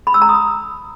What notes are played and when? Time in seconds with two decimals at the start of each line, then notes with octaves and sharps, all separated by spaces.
0.07 B5
0.14 E6
0.22 A#5
0.29 D#6